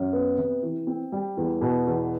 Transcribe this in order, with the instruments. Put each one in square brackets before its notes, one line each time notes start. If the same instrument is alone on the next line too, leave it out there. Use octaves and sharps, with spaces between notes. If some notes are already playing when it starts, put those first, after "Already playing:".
Already playing: [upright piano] F#2
B3
C3
E3
C4
G3
E2
B2
E2